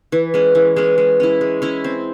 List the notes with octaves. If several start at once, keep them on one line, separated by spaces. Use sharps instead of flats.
E3
G#3 C#4
E3
G#3 C#4
G#3
C#4 E4
G#3
C#4 E4
C4